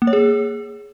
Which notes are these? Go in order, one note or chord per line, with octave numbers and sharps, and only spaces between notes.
A#3
C#5
G#4